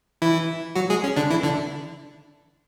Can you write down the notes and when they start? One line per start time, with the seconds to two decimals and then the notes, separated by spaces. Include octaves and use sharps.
0.22 E3 E4
0.75 F#3 F#4
0.90 G#3 G#4
1.04 C#4
1.16 D3 D4
1.30 E3 E4
1.43 D3 D4